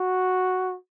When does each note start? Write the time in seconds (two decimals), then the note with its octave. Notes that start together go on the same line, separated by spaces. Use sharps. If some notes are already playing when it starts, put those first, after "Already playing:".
Already playing: F#4